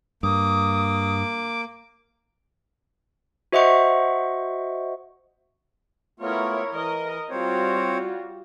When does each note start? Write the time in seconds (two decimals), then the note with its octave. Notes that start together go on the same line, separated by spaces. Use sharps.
0.23 G2 A#3 D6 D#6
3.52 F#4 C5 D#5 E5 F#5 C#6
6.20 A3 B3 E4 F4 A#4 C#5
6.72 E3 A#4 D#5
7.30 G3 C4 F4 F#4 C5 C#5